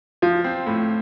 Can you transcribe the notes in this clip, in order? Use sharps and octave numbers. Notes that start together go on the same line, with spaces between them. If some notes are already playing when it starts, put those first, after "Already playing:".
F3 F4
C4
A2